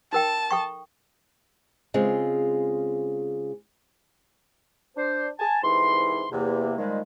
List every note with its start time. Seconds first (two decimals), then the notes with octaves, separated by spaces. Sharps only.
0.13 D#4 A#4 G5 A5
0.51 A4 G5 C#6
1.94 C#3 G#3 C4 F4
4.97 D4 C5
5.40 G#5 A5
5.63 C2 G#2 E3 C6
6.32 E2 C3 A#3
6.78 A#2 D#3 F3 G3 G#3